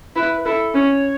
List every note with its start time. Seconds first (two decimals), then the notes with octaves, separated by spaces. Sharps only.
0.16 E4 B4
0.41 B4
0.45 E4 A4
0.74 C#4 C#5